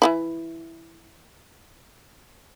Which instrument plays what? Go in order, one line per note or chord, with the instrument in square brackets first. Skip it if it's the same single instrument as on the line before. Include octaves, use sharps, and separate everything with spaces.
[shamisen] E3 D#4 E4